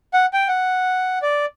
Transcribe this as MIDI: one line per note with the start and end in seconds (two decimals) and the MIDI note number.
0.14 0.26 78
0.33 0.48 79
0.48 1.19 78
1.22 1.46 74